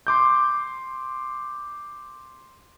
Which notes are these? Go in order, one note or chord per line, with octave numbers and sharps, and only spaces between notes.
C6 D6 G6